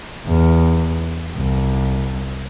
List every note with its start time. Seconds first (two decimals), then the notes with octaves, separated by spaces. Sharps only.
0.26 E2
1.36 C2